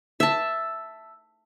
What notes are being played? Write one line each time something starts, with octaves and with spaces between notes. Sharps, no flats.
E5 A5